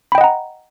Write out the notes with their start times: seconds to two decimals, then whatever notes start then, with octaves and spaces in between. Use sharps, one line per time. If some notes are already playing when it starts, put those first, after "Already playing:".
0.12 B5
0.15 G5
0.18 D#5
0.21 F#5
0.24 A#5